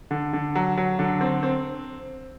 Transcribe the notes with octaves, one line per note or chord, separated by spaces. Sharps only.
D3
D3
F#3
F#3
D3
C4
C4